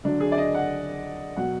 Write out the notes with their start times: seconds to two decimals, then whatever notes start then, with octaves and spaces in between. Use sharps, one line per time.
0.04 D3 F#3 D4
0.20 G#4
0.32 D5
0.38 D#5
0.54 F#5
1.36 B2 F#3 F#5